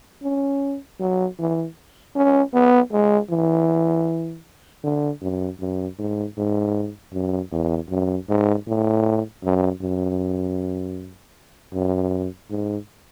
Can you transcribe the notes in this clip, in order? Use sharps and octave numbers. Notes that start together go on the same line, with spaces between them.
C#4
F#3
E3
C#4
B3
G#3
E3
D3
F#2
F#2
G#2
G#2
F#2
E2
F#2
G#2
A2
F#2
F#2
F#2
G#2